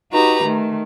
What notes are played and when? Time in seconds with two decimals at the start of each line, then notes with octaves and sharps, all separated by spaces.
0.13 D#4 F#4 G4 B4 A#5
0.43 D#3 A3